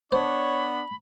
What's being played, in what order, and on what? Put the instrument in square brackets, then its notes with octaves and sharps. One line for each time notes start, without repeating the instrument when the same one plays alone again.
[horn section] B3 D4 [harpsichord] C5 [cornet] C#5 [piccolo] B5